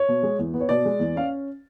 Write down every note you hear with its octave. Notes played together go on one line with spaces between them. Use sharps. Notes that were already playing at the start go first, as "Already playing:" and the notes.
Already playing: C#5
B2
G#3
E2
B3
C#5
B2 D5
G#3
E2
C#4 F5